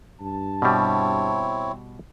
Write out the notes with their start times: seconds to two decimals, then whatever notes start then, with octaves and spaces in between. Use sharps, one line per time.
0.21 G2 A5
0.62 B2 G3 C4 E4 C#5